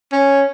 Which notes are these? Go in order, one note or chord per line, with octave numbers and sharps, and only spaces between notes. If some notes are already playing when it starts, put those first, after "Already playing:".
C#4